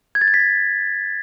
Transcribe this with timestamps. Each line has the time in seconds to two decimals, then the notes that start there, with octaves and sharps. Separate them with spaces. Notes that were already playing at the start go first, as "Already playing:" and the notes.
0.15 G#6
0.21 A6
0.28 G#6
0.34 B6
0.40 A6